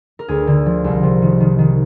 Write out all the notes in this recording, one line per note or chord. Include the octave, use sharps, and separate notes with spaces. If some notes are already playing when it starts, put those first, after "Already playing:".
A#4
D2 G#4
D3
F3
C2
C3
D#3
D#3
D#3